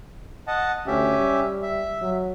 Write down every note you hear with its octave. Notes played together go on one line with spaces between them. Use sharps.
D#5 F#5 A5
D2 C#4 G4 E5
G3
E5
F#3